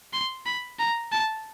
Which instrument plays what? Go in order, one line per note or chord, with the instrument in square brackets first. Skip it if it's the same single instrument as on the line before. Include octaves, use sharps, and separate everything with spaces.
[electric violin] C6
B5
A#5
A5